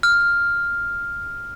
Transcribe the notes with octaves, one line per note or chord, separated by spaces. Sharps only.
F6